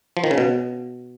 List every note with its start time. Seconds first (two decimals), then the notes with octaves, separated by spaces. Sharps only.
0.17 F3
0.24 D#3
0.31 C#3
0.38 B2